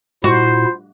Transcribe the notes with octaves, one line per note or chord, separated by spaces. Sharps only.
A#2 E4 F#4 C5